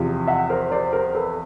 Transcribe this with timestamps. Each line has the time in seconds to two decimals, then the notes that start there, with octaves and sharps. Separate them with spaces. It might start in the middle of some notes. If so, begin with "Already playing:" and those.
Already playing: E2 C3 F3
0.27 E5 F#5
0.50 A#4 C5
0.72 C5 D5
0.93 A#4 C5
1.15 A4 B4